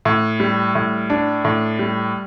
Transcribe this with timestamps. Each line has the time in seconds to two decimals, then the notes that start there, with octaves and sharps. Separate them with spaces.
0.05 A2
0.40 G3
0.75 A2
1.10 D4
1.45 A2
1.79 G3